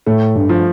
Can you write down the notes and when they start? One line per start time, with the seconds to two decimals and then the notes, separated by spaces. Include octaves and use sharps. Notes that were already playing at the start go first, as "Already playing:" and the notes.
0.06 A2 A3
0.35 G2
0.49 F3